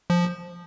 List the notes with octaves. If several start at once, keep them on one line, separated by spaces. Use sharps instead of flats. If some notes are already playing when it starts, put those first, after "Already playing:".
F3